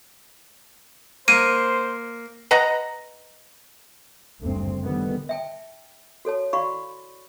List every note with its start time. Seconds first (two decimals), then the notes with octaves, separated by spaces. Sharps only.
1.28 A#3 C5 D#7
2.51 B4 D#5 F#5 A#5
4.41 F#1 D2 G2 C4
4.82 D3 D#3 G3 B3
5.29 E5 G5 A5
6.25 F#4 A4 C#5 A5
6.53 E4 F#4 D5 F5 B5 C#6